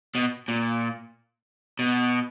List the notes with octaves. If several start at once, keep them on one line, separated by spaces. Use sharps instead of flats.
B2
A#2
B2